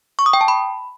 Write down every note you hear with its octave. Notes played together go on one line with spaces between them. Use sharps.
C#6
D#6
G5
A5
B5